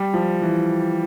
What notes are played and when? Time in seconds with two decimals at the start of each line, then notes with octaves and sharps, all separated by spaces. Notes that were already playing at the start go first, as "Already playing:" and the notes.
Already playing: G3
0.14 F3
0.42 E3